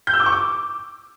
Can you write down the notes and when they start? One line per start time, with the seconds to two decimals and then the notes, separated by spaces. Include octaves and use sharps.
0.07 G6
0.13 E6
0.20 D6
0.26 C#6
0.33 D6